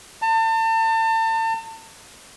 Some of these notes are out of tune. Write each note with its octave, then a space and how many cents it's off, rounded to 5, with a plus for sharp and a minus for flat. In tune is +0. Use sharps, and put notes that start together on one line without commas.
A5 +35